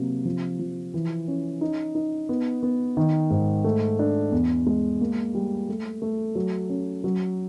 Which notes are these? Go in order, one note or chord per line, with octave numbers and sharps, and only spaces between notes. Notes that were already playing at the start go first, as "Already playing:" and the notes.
Already playing: C3 F#3 A#3
F3
F3
E3
C#4
D#4
D#4
B3
B3
D#3
G#2
A3
D4
E2
G#3
A#3
G3
A3
A3
F#3
C#4
F#3